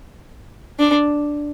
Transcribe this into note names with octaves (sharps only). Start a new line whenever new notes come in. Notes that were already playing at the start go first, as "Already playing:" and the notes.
D4